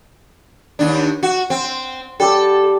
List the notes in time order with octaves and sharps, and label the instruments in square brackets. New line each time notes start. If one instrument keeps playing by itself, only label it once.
[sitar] D#2 D4
F#4
C4
[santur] G3 G4 A5 [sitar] A4